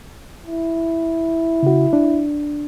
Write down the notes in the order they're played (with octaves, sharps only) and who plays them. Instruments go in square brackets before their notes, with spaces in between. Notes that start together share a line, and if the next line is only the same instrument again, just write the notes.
[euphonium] E4
[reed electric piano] C#3 F#4
D4